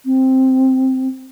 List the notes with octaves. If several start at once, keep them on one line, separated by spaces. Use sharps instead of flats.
C4